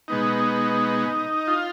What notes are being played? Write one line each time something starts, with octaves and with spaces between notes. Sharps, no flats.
B2 G#3 B3 D#4
F4